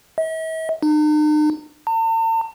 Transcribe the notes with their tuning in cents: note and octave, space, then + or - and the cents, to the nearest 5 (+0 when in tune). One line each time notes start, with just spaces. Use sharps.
E5 -45
D#4 -45
A5 +45